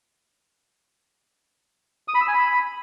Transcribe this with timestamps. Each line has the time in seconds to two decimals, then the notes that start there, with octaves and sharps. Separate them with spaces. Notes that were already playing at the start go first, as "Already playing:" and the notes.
2.08 D#6
2.15 B5
2.21 E6
2.27 G#5
2.34 B5